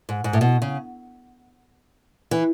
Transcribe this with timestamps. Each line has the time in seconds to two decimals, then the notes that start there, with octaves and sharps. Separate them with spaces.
0.09 G#2
0.24 G#2
0.33 A2
0.41 B2
0.62 C#3
2.31 E3